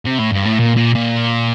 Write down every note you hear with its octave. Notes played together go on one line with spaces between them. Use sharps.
C3
A2
G2
A2
A#2
A#2
A#2